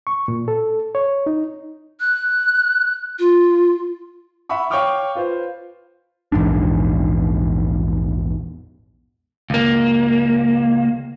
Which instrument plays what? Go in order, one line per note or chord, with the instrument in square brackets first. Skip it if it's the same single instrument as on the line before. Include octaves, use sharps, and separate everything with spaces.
[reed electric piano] C#6
A#2
A4
C#5
D#4
[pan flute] F#6
F4
[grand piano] E5 F#5 B5 C#6
C#5 F5 G5 C#6 D6 F6
F4 B4 C5
[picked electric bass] A#1 E2 G#2 D4
[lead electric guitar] C#2 A#3